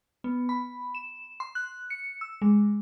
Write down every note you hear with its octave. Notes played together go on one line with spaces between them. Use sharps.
B3
B5
E7
C6
F#6
C#7
E6
G#3